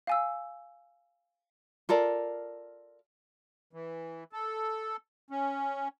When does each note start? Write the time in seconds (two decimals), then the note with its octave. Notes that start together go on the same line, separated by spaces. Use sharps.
0.07 F5 G#5 E6
1.89 F4 A4 A#4 D5
3.73 E3
4.32 A4
5.30 C#4